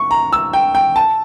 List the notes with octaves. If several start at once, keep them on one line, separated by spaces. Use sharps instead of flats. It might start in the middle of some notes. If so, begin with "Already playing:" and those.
Already playing: C#6
A#5
E6
G5
G5
A5